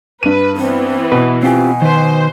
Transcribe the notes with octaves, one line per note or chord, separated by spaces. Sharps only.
G2 B4 D#7
E3 B3 C4
B2 B4
C4 F4 G4 G#5
D#3 B4 C5